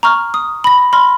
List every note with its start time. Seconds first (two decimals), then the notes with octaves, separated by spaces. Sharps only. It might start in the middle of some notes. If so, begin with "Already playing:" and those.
0.03 A#5 C#6 F6
0.34 D#6
0.64 B5 A#6
0.93 B5 C6 F6 A#6